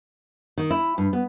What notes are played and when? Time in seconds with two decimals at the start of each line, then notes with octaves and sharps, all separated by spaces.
0.58 D#3
0.71 E4
0.98 G2
1.13 B3